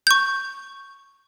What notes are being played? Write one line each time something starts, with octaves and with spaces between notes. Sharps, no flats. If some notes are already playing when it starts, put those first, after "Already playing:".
C#6 G6